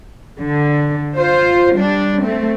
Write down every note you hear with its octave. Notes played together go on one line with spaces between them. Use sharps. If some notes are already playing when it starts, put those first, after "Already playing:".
D3
F4 C5
G3 D4
A3 C4